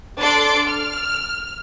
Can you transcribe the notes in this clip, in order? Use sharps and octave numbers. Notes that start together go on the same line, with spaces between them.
D4 A4 D5 C6 D7
F6